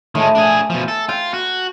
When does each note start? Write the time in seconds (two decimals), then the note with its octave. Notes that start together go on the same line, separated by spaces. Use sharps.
0.15 A2 D#3 G#3
0.35 D4 G#4 G#5
0.70 B2 F3
0.88 A4
1.09 F4 G5
1.34 F#4